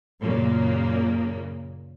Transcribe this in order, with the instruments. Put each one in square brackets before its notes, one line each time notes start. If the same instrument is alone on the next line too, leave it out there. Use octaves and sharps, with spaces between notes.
[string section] F#2 A#2 C#3 A#3